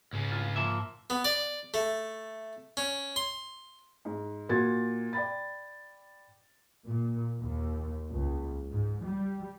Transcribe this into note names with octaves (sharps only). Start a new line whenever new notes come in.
C#2 G#2 C#3
C2 F4
F3 A#3 E5
B3
D5
A3
C#4
C6
G#2
A#2 F#4 G#6 A6
D5 G5 B5 A6
A#2
D#2
C#2
G#2
G3